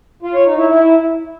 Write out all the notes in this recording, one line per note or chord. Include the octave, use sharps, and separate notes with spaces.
F4
C#5
D#4
E4
E4